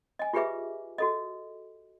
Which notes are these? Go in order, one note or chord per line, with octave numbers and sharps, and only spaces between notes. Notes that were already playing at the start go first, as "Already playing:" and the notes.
D#5 G#5
F4 G4 G#4 B4 E5 D6
F#4 A4 D#5